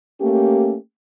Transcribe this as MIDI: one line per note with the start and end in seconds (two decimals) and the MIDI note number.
0.21 0.76 57
0.21 0.76 58
0.21 0.76 61
0.21 0.76 67